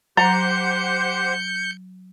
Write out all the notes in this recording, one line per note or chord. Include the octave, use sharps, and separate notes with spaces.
F#3 G4 C5 F#5 A#5 G6 C#7